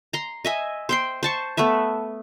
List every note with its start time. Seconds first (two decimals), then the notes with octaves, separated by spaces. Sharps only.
0.13 A#5 C6
0.45 D#5 E5 G#5
0.89 C5 G5 C6
1.23 C5 A5 C#6
1.57 A3 B3 B4 E5